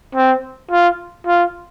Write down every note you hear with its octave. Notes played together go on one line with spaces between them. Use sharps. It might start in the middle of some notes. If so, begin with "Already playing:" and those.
C4
F4
F4